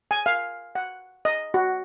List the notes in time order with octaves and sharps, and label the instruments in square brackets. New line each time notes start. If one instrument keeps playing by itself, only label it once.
[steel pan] G#5
F5
F#5
D#5
F#4